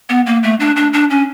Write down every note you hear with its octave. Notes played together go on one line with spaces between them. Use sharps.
B3
A#3
A3
D4
D4
D4
C#4